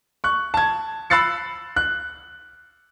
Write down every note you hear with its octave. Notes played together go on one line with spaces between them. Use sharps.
C#6 F#6
A5 G#6
B5 E6 F#6 A6 C7 C#7
F#6